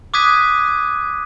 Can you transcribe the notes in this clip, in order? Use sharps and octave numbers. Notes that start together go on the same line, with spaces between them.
D6 D#6 F#6 G#6 B6 D#7